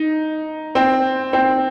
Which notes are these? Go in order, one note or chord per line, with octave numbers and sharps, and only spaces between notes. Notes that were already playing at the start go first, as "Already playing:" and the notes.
Already playing: D#4
C4
C4